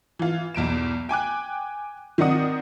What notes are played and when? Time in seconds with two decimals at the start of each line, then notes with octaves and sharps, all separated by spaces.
0.19 E3 F4
0.55 B1 E2 D7 E7
1.09 G5 G#5 D6 F#6
2.18 D#3 C4 D#4 D5 F#5 D#6